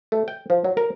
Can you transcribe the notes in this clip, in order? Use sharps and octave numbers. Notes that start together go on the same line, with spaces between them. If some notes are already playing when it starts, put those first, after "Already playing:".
A3
G5
F3
F#3
A#4